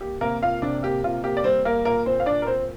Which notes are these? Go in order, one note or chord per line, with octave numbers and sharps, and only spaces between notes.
A#3 G4
C3 A#3 A#4
A#3 F4 F5
C3 D4 D5
A#3 G4
C3 F4
A#3 G4
D5
G3 C4 C5
A#3 A#4
A#2 A#3 A#4
A#2 C4 C5
F5
A#2 D4 D5
A#4
A#2 C4 C5